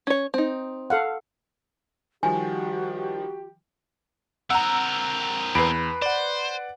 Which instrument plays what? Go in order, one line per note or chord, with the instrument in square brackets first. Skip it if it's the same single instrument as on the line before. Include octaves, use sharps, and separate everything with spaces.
[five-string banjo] C#4 C#5
C4 D#4
[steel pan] A4 F5 F#5
[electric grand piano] D#3 F3 G3 [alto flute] F#4 [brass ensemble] G4 [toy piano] G#5
[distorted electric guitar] C4 A#4 [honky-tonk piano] F#5 A#5 [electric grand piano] E6
[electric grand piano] E2 C7 [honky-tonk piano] B4 D7 [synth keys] B5
[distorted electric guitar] C5 [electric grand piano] D5 F#5